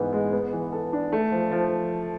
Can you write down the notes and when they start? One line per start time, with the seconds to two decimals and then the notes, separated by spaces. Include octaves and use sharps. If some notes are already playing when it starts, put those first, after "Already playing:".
Already playing: G#2 E3 B3
0.13 G#3
0.32 B3
0.53 E3
0.73 A4
0.93 D4
1.12 A3
1.31 F3
1.51 F3